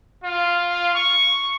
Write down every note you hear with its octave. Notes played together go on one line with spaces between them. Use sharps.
F4
C#6